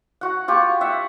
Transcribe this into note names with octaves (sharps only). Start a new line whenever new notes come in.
F#4 F#5
F4 G4 C#6
E5 F#5 C#6